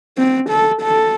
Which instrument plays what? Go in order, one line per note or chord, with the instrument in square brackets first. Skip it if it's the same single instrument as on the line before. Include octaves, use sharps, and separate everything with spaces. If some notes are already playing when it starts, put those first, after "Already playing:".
[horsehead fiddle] C4
A4
A4